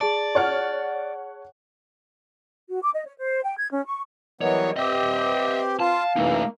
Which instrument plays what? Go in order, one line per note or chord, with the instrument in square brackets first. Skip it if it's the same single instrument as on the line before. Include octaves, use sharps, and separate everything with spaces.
[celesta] G#4 A5 [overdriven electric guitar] D5
[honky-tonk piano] C#5 F#5 F6
[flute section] F#4
D6
D#5
C#5
C5
G5
G#6
C#4
C#6
[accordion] E3 F#3 B3 [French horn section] G3 A#4 D#5 [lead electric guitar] C#5
[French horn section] C4 B4 [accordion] G4 [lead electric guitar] D#5 E5
[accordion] F4 [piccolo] F5 [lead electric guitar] A5
[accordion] F#2 E3 [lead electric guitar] A3 D#4 [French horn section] A#3